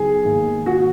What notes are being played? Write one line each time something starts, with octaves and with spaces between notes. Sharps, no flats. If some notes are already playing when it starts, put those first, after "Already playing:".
Already playing: C#3 F#3 B3 D#4 G#4
G#2 D#3 A#3
F#4